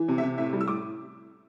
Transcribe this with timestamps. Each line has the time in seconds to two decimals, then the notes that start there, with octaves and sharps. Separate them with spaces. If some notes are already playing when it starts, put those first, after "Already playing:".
Already playing: E3
0.08 C3
0.18 E5
0.23 C3
0.38 A2 E5
0.53 G3
0.61 E6
0.68 A2 D6